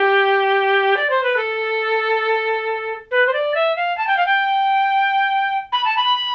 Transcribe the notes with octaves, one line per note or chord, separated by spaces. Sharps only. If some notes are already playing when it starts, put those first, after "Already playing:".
Already playing: G4
D5
C5
B4
A4
B4
C5
D5
E5
F5
A5
G5
F5
G5
B5
A5
B5